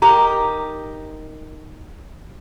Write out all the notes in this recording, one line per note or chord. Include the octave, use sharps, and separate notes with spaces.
D#4 G4 A#4 A#5